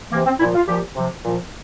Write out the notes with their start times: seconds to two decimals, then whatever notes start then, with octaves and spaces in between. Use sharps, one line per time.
0.12 C3 E3 A#3
0.26 C4
0.40 A#2 F3 E4
0.55 F4
0.68 A#2 F3 G4
0.96 C3 F3
1.24 A#2 F3